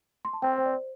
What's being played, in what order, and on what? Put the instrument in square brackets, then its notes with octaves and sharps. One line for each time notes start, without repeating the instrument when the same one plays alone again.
[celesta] C6
A5
[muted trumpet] C4 [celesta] G5
[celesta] C5
D5
C5